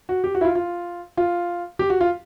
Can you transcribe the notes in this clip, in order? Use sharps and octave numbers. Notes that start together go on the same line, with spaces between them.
F#4
G4
F#4
E4
F4
F4
F4
G4
F#4
F4